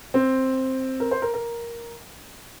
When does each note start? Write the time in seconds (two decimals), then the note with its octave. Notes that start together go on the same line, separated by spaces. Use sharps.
0.14 C4
1.00 A#4
1.11 C5
1.22 A#4
1.34 A#4